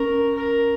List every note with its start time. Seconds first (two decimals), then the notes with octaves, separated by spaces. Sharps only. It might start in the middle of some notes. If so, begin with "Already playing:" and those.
Already playing: C#4 A#4
0.35 A#4